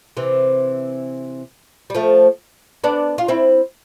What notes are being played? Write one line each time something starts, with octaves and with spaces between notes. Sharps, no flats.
C3 E3
G3
F3 A3
B3 D4
F4
C4 E4